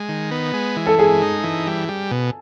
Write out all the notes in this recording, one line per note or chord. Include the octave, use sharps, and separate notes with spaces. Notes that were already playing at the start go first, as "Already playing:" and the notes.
Already playing: G#3
D#3
B3
G#3
E3
A4
G#3 G#4
D#4
E3
G3
G3
B2